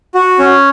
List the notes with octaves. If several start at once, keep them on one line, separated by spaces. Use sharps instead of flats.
F#4
C#4